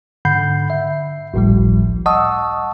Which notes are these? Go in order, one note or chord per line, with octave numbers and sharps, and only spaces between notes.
G#2 D3 F#5 B5 G6 C7
E5
G#1 C#2 A2 F3 G3
D#5 F#5 A5 C#6 D#6 E6